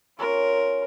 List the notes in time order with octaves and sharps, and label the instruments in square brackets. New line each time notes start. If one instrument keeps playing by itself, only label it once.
[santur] C#4 C#5 G#5 [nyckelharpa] F4 A#4